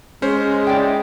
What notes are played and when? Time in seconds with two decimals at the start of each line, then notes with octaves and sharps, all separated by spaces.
0.22 G#3 C#4 C5
0.67 E4 D5 G5